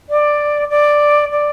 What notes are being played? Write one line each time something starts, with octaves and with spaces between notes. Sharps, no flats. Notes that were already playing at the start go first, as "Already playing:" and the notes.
D5
D5
D5